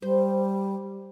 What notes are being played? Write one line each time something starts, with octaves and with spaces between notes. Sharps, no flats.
G3 C5